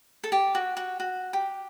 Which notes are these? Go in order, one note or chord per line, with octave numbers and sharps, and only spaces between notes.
A4
G4
F#4
F#4
F#4
G4